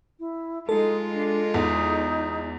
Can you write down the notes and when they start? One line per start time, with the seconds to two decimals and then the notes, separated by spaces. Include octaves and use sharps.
0.19 E4
0.69 G#3 D#4 F4 A4
1.13 D4
1.54 E2 D#4